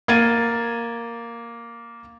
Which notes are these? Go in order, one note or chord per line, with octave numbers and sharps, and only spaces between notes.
A#3 G#6 A6 D#7